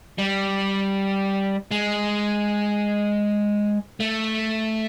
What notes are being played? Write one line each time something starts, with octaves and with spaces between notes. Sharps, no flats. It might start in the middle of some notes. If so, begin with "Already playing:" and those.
G3
G#3
A3